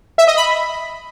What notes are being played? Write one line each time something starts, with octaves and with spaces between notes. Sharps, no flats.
E5
D#5
B5